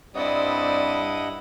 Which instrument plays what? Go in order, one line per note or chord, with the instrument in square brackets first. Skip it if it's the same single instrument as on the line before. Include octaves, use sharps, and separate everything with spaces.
[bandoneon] G2 D#5 F#5 [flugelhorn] G3 [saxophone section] C4 D5 [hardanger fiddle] E4 D#6